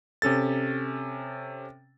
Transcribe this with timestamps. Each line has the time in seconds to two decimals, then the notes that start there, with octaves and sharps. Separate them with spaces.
0.22 C3 C#4 A4 A6